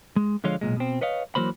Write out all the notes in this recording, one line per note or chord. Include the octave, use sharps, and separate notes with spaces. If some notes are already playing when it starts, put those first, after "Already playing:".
G#3
D3 F3 G#3 F4 C#5 F5
B1 A#2 G#3
B2 C4
B4 C#5 D#5 F5
E3 F#3 A#3 C5 B5